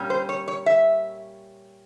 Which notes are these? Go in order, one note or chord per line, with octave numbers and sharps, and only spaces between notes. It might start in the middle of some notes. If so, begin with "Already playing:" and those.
Already playing: A#2 G3 C#4
C5
C#5
C#5
E5